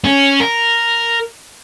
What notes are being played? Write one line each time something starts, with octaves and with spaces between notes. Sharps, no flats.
C#4
A#4